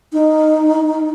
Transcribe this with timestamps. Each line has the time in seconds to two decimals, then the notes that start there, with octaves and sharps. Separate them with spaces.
0.13 D#4